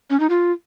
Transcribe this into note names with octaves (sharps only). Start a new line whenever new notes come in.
C#4
D#4
F4